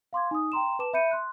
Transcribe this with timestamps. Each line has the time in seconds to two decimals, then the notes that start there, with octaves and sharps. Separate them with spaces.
0.13 F5 C6 D6 G#6
0.31 D#4 D#6
0.52 G5 A#5 C6 E7
0.79 B4 A5 D6 E7
0.93 E5 B5 G6 C#7 D#7
1.11 C6 F#6